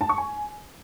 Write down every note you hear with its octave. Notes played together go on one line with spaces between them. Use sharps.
A5
C#6
G#5